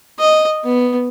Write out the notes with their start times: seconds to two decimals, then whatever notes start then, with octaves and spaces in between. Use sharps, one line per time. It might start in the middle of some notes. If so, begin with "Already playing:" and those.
0.19 D#5
0.64 B3